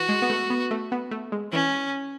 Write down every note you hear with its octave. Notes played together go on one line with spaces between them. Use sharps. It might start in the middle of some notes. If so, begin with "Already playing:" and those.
Already playing: E3 F#4
G#3
B3
A3
B3
A3
B3
A3
G#3
E3 C#4